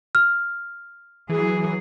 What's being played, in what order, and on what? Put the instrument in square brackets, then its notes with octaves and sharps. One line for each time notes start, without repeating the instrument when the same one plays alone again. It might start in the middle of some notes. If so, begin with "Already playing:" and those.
[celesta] F6
[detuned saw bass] E3 [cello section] F#3 G#4